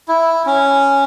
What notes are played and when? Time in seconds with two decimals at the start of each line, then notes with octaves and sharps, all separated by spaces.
0.08 E4
0.46 C#4